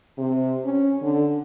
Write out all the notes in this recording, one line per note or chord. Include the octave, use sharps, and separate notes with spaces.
C3
C#4
D3